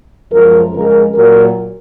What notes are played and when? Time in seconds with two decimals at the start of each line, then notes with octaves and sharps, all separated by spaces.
0.31 F#2 F3 G#3 A#4
0.73 F2 C#3 G#3 A#4
1.14 A#2 F#3 A#4